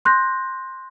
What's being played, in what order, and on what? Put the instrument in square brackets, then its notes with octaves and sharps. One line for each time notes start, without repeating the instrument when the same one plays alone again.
[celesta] C6 F#6 G6 A#6